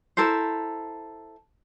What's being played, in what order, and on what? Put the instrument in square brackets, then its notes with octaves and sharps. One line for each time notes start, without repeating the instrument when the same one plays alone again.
[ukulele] E4 A4 A#4 C5